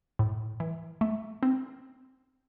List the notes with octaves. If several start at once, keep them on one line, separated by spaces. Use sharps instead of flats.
A2
E3
A3
C4